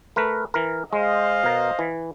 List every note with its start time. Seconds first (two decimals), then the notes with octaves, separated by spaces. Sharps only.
0.16 A3 A#4 B4
0.54 E3 A#4
0.93 G#3 C5 D#5 F5
1.44 B2 A#4
1.79 E3